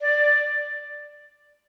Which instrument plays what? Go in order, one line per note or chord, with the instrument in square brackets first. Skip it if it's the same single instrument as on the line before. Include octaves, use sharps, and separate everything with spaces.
[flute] D5